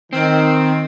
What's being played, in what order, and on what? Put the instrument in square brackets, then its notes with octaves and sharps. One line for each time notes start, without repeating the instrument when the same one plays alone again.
[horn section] D#3 [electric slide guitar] C4